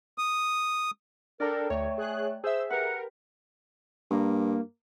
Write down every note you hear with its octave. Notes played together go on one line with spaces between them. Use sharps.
D#6
D4 A4 A#4 D5 G5 A#5
D2 A3 C#5
G#4 F#6
G#4 C5 E5 E6
G4 A#4 B4 F#5
G2 A#3